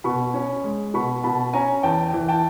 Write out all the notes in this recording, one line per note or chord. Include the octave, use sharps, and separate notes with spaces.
B2 B5 C#6
C#4
G#3
B2 B5 C#6
B2 A5 B5
C#4 G#5 A#5
E2 G5 A5
E3
G5 A5